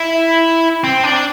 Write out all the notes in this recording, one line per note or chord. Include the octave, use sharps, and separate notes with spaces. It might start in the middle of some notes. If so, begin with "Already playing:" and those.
Already playing: E4
C4
D4